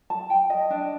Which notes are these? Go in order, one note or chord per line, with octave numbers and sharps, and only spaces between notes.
A5
G5
D#5
D4